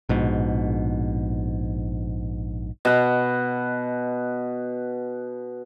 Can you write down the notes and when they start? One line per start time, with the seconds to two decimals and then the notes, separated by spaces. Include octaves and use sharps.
0.09 A#1 G#2 B2
2.85 B2 F#5